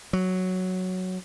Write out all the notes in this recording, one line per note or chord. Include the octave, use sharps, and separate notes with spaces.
F#3